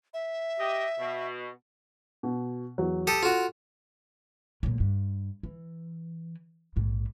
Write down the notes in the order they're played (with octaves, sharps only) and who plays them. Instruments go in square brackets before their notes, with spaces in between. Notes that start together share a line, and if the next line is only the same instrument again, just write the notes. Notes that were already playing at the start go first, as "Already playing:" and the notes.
[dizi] E5
[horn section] G4 D#5
B2
[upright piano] B2
E2 F#3
[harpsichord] G4 A4 D#6
[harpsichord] F4 F#4 [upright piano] A4
[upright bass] A#2 F#3
G2
E3
A#1 G#2